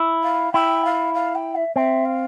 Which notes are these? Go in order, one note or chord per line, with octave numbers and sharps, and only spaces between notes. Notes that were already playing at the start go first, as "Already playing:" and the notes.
Already playing: E4
F5
E4 G5
F5
F5
G5
E5
C4 E5
F5